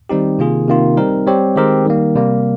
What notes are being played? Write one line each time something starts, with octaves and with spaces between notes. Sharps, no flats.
D#3 G3 C4 D#4 G4
C3 D#3 A#3 F4 G#4
C3 D#3 A#3 F4
G3 C4 D#4 A#4
G3 C4 G4 C#5
D#3 G#3 C4 G4 A#4
D#3 G3 A#3
C3 G3 A#3